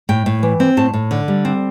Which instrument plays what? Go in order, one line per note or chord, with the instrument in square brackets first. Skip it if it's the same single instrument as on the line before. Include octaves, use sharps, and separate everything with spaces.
[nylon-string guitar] A2 G5
A2
E3
C4
A2 A5
A2
D3
G3
C4